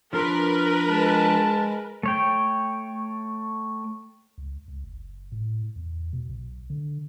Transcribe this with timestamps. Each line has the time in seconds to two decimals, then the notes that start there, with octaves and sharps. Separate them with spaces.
0.13 F3 D4 A#4 B4 C6 F6
0.88 G#3 A5
2.03 A3 C#5 G5
4.38 C#2
4.68 C#2
4.84 F#1
5.32 A2
5.76 E2
6.13 B2
6.29 B1
6.70 D3